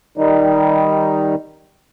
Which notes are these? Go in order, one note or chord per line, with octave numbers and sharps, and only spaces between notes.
D#3 G3 D#4